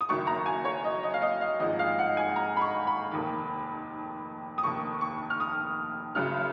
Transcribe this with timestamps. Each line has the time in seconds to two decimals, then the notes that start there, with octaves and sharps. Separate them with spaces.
0.01 D#6
0.08 F#1 F#2 D#3 C#6
0.27 A#5
0.46 G#5
0.65 C#5
0.84 D#5
1.03 D#5
1.14 F5
1.22 D#5
1.41 F5
1.60 G#1 G#2 F3 D#5
1.79 F5
1.99 F#5
2.17 G#5
2.36 A#5
2.57 B5
2.61 C#6
2.87 B5
3.11 F1 D#2 D#3
4.58 D#6
4.63 F1 D#2 D#3 C#6
5.01 C#6
5.30 F6
5.40 D#6
6.15 F#1 F#2 C#3 F6